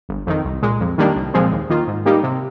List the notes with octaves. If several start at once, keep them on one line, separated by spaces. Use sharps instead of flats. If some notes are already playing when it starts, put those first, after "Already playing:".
G1
F2 D#3
C2
A#2 G#3
F2
D#3 G3 A#3 D4
C2
A#2 F3 G#3 C4
D#2
D#3 A#3 F4
G#2
G3 A#3 D#4 G4
C3